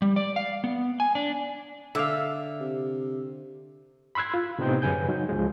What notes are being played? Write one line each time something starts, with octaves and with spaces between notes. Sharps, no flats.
G3
D5
F5
B3
G#5
D4
D3 D5 E5 F5
C3
B5 C6 E6 F#6 G#6
F4
A2 C3 B3 C4 D#4 G6
F#2 C#3 B4 G#5 G6
F#3 D#4
C#2 F3 G#3